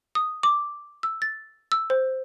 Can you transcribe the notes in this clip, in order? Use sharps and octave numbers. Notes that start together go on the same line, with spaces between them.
D#6
D6
E6
A6
E6
C5